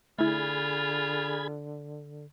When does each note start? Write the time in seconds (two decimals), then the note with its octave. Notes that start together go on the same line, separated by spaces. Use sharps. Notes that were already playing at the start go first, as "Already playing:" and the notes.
0.19 D3 A3 E4 F4 G#4 B5 G#6